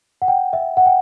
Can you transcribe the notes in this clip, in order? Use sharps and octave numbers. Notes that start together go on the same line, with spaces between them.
F#5
G5
E5
F#5
G5